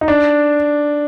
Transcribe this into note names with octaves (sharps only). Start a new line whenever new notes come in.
D#4
D4